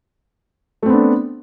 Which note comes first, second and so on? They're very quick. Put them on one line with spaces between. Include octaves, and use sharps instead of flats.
A3 C4 B3 D4